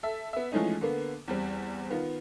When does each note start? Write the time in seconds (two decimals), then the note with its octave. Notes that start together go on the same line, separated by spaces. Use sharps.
0.03 A4 E5
0.33 B3 E5
0.52 E3 F3 G#3 A3 C#4 D#4
0.81 D3 A#3 B3
1.28 E2 G3 C4
1.91 D#3 B3 F4